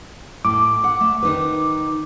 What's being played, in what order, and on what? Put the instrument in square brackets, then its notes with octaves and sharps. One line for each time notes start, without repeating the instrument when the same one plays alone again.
[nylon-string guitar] A2 [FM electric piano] D6
[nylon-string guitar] F#5
A3
D#3 D#4 B4